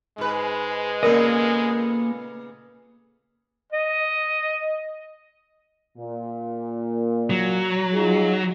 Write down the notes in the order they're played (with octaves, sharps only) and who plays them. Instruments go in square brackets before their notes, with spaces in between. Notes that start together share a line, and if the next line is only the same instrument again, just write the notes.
[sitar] G#2 B4 [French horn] G#3
[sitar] A#2 C#3 B3 [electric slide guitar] A#3 A4 D#5 [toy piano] A#4 D5
[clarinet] D#5
[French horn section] A#2
[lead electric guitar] F#3
[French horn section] D#4 F4 G#4